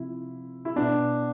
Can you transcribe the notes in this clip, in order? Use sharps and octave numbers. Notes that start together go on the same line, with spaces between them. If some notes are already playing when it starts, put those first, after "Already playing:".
Already playing: C3 F3 E4
E4
B2 D4